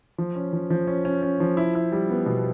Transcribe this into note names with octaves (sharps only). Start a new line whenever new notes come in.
F3
C#4
F3
F3
C#4
C#4
C#4
F3
E4
E4
G3
B3
B2